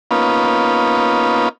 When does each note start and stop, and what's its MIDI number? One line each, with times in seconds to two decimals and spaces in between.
0.11 1.49 58
0.11 1.49 59
0.11 1.49 61
0.11 1.49 63
0.11 1.49 65
0.11 1.49 71